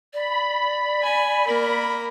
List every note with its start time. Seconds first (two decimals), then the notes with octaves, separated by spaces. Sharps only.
0.13 D5 B5
1.02 G#5
1.46 A#3 A#4